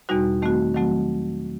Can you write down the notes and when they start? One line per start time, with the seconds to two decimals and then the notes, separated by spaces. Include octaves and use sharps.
0.09 E2 B2 G3 D#4 F#4
0.42 D#3 A3 C4 F#4
0.74 D#3 F#3 A3 C4 F#4